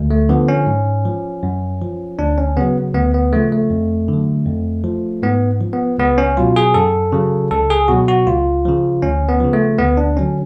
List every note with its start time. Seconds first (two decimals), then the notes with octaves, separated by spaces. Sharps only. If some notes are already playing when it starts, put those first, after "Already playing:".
Already playing: D2
0.11 A3
0.29 D3 F3 B3
0.48 C#4
0.66 G#2
1.05 F3
1.43 F#2
1.81 F3
2.19 D2 D4
2.38 C#4
2.57 C#3 F#3 B3
2.94 D2 B3
3.14 B3
3.33 C#3 F3 A3
3.52 A3
3.70 F2
4.08 D3
4.14 F#3
4.46 F2
4.84 F3
5.22 G#2 B3
5.61 F3
5.73 B3
5.98 C#2 B3
6.18 C#4
6.37 B2 F#3 F4
6.56 G#4
6.74 F#2 A4
7.12 C#3 F#3
7.51 C#2 A4
7.70 G#4
7.88 B2 F#3 F#4
8.08 F#4
8.26 C#2 F4
8.65 C#3 F3
9.02 D2 C#4
9.29 B3
9.40 C#3 F3
9.53 A3
9.78 D2 B3
9.97 D4
10.17 D3 F#3 C#4